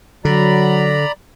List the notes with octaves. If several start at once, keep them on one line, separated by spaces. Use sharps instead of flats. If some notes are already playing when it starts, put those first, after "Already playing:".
D3 F#3 D5 A#5 B5